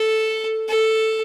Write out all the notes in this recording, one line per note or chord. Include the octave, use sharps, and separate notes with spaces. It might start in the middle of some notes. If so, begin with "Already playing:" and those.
Already playing: A4
A4